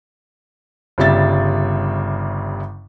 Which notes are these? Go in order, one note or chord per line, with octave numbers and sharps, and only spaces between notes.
G1 C#3 G3 E5 A6